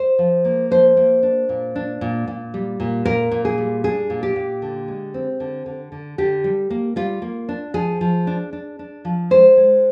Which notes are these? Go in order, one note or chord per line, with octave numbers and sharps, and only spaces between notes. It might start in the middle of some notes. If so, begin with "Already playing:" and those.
Already playing: C5
F3
A#3
F3 C5
A#3
D4
A#2
D4
A#2
A#2
G3
A#2
A#2 A#4
A#2
G#4
G3
D4 G#4
A#2
G4
A#2
D3
G#3
C4
D3
D3
D3
D3 G4
G3
A#3
G3 F4
A#3
D4
F3 G#4
F3
D4
D4
D4
F3
G#3 C5
G#3